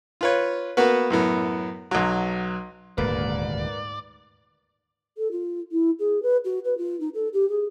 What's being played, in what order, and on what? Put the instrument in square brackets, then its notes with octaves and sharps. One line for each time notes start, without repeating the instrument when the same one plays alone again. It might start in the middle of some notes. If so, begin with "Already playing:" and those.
[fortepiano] F4 B4 C#5
A#3 B3 F#4 B4
F#2 A2 B3
B1 F#3
[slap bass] D#1 D2 [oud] G#2 [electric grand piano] A#3 B4 [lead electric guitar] D5
[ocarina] A4
F4
E4
G#4
B4
F#4
B4
F4
D#4
A4
G4
G#4